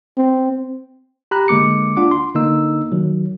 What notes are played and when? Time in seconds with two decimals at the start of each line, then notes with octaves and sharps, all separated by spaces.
0.18 C4
1.31 G4 A#5 B5 F#6
1.48 D3 G#3 A#3 D6 C#7
1.97 D4 F4 F#5 D6
2.11 C6
2.35 D3 A#3 D#4 E6
2.92 D#3 F#3